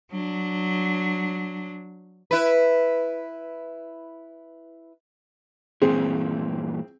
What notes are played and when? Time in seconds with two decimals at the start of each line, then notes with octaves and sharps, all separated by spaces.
0.11 F#3 D4
2.31 E4 B4
5.82 G2 A#2 E3 C4 G#4